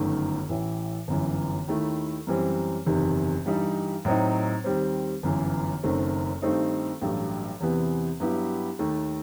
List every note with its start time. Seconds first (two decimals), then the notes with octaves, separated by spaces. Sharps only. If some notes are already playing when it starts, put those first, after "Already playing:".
Already playing: G1 F#2 D#3 A3
0.49 A1 A2 E3
1.08 G1 F#2 E3
1.67 D#2 D#3 A3 E4
2.27 F#2 E3 G3 C4
2.86 F#1 E2 C3 D#3
3.46 G2 E3 G3 D#4
4.05 A2 F#3 C4 D#4
4.64 D#2 D#3 G3 C4
5.23 G1 F#2 E3
5.83 F#1 F#2 D#3 A3 C4
6.42 G2 D#3 A3 C4 D#4
7.01 A1 G2 F#3 A3
7.60 E2 C3 E3 B3
8.20 G2 F#3 B3 E4 G4
8.79 D#2 D#3 A3